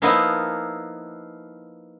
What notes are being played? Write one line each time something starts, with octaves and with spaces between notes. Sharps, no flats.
F3 A#3 B3 D#4 E4